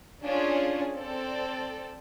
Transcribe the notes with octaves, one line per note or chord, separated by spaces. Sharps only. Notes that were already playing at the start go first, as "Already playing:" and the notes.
C#4 D4 F4 G#4
C4 A4 D5